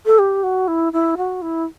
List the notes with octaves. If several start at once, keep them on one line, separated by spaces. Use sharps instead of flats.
A4
G4
F#4
E4
E4
F#4
E4